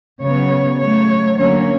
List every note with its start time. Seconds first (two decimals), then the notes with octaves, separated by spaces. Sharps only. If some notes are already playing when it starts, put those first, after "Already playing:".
0.22 C#3 F#3 B3 C#5
0.80 C#3 F#3 A3 C#5
1.38 D3 F#3 A#3 C#4 C#5